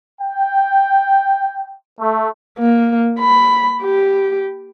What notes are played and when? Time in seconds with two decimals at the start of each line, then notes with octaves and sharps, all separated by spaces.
0.19 G5
1.98 A3
2.59 A#3
3.20 B5
3.82 G4